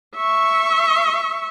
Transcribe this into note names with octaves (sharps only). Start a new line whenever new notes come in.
E5 C#6